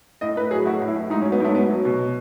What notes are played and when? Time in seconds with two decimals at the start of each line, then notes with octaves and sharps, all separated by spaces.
0.21 A2 D#5
0.36 A2 B4
0.51 F#3 G#4
0.66 A2 F#4
0.81 A2
0.88 E4
0.96 A2
1.10 G#2 D#4
1.22 C#4
1.25 F#3
1.32 B3
1.40 G#2 A3
1.55 F#3 B3
1.70 F#3
1.85 B2